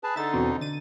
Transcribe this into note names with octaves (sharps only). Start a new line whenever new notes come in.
G#4 B4 A5
D3 D#4 E5 A6
E2 B2 C4
D3 A6 D#7